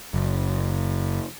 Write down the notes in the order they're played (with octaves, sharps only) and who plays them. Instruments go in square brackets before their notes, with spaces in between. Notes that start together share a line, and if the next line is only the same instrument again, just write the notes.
[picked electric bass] F#1